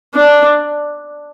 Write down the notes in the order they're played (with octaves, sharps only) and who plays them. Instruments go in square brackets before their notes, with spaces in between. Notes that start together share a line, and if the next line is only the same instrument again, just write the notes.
[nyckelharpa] D4